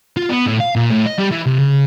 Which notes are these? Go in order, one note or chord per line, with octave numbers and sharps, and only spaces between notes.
F4
B3
A2
F5
A#2
A2
D#5
G3
E3
C3
C#3